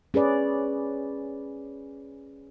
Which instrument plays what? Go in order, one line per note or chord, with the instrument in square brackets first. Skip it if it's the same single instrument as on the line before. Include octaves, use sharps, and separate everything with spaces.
[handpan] C#4 G#4 B4 D5